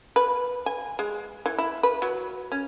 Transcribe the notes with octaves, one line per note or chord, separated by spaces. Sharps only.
B4
G#5
G#3
E3
E4
B4
F#3
C#4